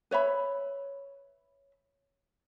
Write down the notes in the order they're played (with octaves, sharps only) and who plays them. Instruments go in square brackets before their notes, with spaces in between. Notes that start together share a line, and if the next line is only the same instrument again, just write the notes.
[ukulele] B4 C#5 E5 B5